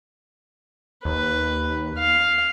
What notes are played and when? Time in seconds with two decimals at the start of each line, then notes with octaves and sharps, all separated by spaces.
1.05 D#2 B4
1.99 F5